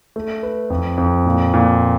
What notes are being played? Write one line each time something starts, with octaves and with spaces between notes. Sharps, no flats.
A3
B4
F2
F2
A#2
A#2